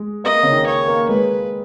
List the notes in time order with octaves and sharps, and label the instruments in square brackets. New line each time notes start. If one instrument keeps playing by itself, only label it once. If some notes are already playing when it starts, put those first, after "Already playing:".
Already playing: [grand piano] G#3
[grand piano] A#3 [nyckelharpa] D#5
[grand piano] C#3
D#3
[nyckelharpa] C#5
[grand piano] A#3
[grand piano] G#3 [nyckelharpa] B4